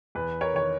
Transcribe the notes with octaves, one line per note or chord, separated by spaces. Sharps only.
E2 B4
A#4 C#5
D#3 C#5